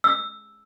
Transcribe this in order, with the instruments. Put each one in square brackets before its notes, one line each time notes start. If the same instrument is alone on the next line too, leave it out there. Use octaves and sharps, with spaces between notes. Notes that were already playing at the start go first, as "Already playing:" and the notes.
[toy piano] E6